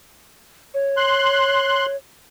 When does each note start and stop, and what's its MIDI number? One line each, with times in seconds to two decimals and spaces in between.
0.74 1.96 73
0.97 1.86 84
0.97 1.86 90